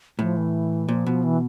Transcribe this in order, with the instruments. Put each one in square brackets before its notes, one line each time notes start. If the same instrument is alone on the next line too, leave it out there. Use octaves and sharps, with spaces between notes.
[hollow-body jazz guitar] A2 [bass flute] F3
[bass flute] E3
[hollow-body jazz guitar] A#2 [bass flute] F3
[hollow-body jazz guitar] B2
[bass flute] E3